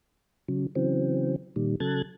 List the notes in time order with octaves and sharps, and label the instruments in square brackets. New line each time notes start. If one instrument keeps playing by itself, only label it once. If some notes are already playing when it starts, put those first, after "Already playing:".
[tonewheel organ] C#3 F#3
C#3 E3 F#3 C4
A#2 D#3 G3
C#3 F#3 A4 F#6 G#6 A6